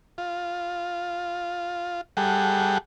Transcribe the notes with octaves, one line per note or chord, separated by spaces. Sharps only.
F4
G3 G#4 A4 F#5 G5